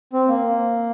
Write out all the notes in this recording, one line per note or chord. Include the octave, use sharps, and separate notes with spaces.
C4
A#3